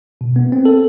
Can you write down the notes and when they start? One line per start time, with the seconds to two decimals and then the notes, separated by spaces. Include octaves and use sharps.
0.21 B2
0.36 B3
0.52 C4
0.65 A4